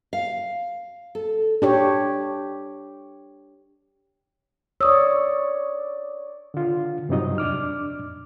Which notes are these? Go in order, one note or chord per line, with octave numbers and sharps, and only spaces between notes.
F5
A4
D4 G4 C#5
C#5 D5 D#6 E6
D3 F4
G2 C3 F#3 D#4 D#5
F2 D4 D6 F6